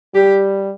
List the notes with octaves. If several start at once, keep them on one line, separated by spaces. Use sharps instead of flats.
G3 G4